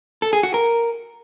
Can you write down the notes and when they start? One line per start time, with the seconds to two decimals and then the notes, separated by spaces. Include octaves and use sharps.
0.22 A4
0.33 G#4
0.43 F#4
0.54 A#4